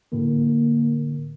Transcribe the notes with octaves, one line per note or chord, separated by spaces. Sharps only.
A2 D3 A#3